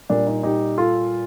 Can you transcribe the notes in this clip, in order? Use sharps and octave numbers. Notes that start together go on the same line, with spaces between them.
A#2 G3 D4
D#4
D#4 G4
F4 A4